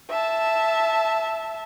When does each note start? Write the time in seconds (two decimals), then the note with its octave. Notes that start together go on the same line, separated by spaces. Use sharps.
0.10 E5 A5